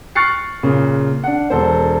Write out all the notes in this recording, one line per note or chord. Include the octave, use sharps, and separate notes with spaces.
C#6 F6 F#6 A6 C7 C#7
A#2 C#3
D4 F#5
E1 A4 C5